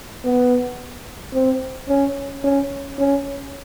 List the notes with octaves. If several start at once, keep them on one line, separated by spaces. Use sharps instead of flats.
B3
C4
C#4
C#4
C#4